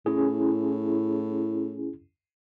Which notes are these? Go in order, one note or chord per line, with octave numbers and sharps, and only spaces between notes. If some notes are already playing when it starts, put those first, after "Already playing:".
A2 C#4 E4 G#4